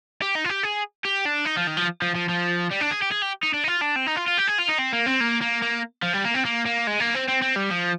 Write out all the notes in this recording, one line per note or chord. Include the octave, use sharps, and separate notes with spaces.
G4
D#4
F4
G4
G#4
G4
D4
D#4
F3
D#3
F3
F3
F3
F3
G3
D4
G#4
G4
G#4
G4
D#4
D4
D#4
F4
D4
C4
D#4
F4
F4
G4
G#4
F4
D#4
C4
A#3
C4
A#3
A#3
A#3
F3
G3
A#3
C4
A#3
A#3
G#3
A#3
C4
C4
C4
G3
F3